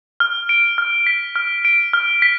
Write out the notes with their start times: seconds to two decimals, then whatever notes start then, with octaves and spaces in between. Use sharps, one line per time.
0.20 F6
0.49 D7
0.78 F6
1.07 B6
1.36 F6
1.65 D7
1.93 F6
2.22 B6